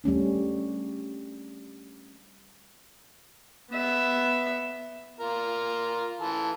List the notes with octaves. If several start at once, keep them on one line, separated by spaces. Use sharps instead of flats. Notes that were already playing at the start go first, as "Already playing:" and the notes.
G3 A3 C#4 D4
B3 E5
F4 A#4
E3 A4